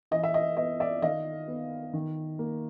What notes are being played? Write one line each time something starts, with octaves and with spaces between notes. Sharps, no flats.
E3 D#5
E5
D#5
B3 D#5
D5 E5
D#3 D#5 F5
B3
D#3
A#3